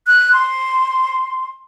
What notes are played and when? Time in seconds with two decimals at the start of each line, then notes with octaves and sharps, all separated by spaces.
0.07 F#6
0.33 C6